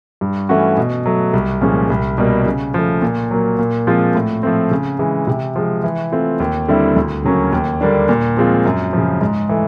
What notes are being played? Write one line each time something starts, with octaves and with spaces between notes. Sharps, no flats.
G2
E3 A3 C#4 F#4
B2
F#3 A3
C2
A#2 F3 G#3 C#4
C2
B2 G3 A#3
C#3
F3 A3
A#2
F#3 A#3
A#2
F3 G#3 C4 F4
A2
F3 A3 C4
C#3
E3 G#3
C3
F3 G#3
E3
A3 C4 F4
D#2
D3 G3 C4 E4
D2
C#3 F#3 A#3 C#4
D#2
D3 G3 A#3 D4
A#2
F3 G#3 C4 F4
F#2
C#3 F3
G#2
E3 A3